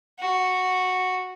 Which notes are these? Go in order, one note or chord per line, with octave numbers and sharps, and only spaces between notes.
F#4